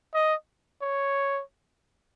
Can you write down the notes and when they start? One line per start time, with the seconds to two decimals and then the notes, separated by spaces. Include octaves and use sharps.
0.15 D#5
0.82 C#5